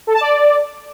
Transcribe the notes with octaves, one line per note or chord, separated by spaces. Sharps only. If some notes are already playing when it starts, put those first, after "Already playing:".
A4
A5
D5